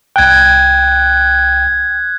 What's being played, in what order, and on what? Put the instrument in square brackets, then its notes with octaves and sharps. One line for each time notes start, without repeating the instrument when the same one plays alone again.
[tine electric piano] C2 G5 [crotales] F#6 G#6